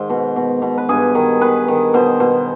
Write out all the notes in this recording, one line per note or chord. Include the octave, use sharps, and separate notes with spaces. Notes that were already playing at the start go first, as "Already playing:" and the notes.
Already playing: G#2 D#3 C5
B2
B2
B2
B4
G2 G#4
D#3
D#3 B4
D#3
B2 C5
B2